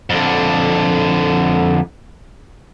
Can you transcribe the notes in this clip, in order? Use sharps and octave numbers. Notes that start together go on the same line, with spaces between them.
F2 D3